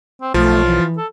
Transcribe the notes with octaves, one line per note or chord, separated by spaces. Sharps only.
C4
B1 F3 A3 F4
E3
A4